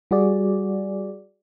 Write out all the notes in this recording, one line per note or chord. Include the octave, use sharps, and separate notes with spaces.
G3 F#4 G#4 D5